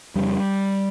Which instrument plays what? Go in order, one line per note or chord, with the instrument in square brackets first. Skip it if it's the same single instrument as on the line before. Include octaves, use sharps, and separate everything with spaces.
[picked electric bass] F2 C#3 G3